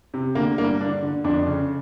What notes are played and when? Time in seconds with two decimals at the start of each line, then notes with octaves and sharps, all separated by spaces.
0.14 C3
0.35 D3 A#3
0.58 G2 A#3
0.80 D3 D4
1.03 D3
1.24 F2 D4
1.47 C#3